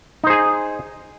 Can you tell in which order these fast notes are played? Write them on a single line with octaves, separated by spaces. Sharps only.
D#4 C5 G#4 G#5